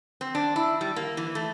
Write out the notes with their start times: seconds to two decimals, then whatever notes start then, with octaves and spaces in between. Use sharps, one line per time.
0.21 C4
0.35 D4
0.56 E4
0.81 G3
0.96 A#3
1.17 E3
1.35 A3